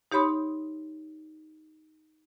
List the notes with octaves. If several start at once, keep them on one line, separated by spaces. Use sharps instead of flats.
D#4 G4 C#5 B5 C6 D#6